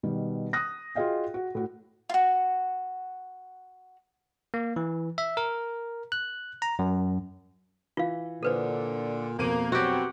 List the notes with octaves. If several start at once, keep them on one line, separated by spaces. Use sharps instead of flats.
B2 D#3 G3
D#6 F#6 A#6
F4 F#4 G#4 D#5 F5 G5
F#4
A2 F#4
F4 F#4
A#3
E3
E5
A#4
F#6
A#5
F#2
E3 F4 F5
A#2 D3 A4 B4 C5
F2 B2 A#3 D#7
F#3 B3 C4 F#4 G4